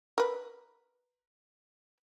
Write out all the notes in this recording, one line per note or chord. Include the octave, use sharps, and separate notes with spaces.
A#4 B4